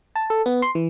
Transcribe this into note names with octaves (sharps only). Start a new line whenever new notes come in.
A5
A4
B3
C6
E3